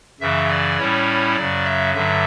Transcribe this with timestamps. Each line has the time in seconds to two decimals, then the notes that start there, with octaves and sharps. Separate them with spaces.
0.20 F#2 C#3 E3 E5
0.49 D5
0.78 A2 G3 C#4 E4 C#5
1.36 F#2 C#3 F#3 D5
1.65 E5
1.94 G2 D3 F#3 E5